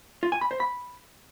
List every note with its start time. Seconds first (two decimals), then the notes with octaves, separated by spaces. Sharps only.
0.23 F4
0.32 G#5
0.41 B5
0.51 C5
0.60 B5